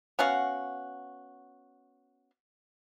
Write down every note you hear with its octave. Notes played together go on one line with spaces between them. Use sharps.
B3 C#4 F#4 F5